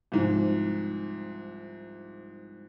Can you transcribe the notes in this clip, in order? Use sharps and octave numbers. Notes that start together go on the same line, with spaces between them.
C2 G#2 F3